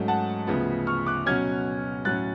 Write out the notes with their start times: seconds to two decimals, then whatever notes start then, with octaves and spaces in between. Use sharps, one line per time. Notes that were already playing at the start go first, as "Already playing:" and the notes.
Already playing: G#2 F#3 A3 C#4
0.08 F#5 A5
0.47 D2 C#3 F3 B3
0.87 C#6 F6
1.06 D6 F#6
1.26 B2 F#3 C#4 F6 G#6
2.05 A2 F#3 C#4 F#6 A6